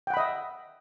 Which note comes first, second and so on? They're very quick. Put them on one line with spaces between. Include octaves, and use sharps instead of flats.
G5 F#5 B5 D#5 E5